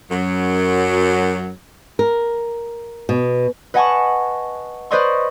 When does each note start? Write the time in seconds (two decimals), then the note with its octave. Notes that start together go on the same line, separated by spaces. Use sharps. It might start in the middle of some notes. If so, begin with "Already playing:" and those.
0.10 F#2 F#3
1.99 A#4
3.09 B2
3.74 B4 D#5 F#5 G#5 A5 C#6
4.91 B4 C5 D5 D#5 C6 C#6